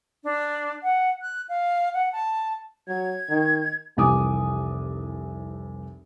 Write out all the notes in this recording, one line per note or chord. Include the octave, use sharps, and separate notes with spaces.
D4
F#5
F#6
F5
F#5
A5
F#3 G#6
D#3
F1 C2 E3 G#5 D6 D#6